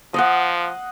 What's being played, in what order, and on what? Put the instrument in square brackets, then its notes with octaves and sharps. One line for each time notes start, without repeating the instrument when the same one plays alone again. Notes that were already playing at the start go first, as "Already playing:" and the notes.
[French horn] F3 [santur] D#5 F5 F#5